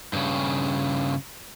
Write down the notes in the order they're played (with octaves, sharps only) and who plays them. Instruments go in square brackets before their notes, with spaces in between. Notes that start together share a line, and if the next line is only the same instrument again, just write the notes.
[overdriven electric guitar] G2 C#3